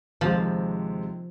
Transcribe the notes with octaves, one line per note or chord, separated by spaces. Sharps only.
D#2 C3 F3 G#3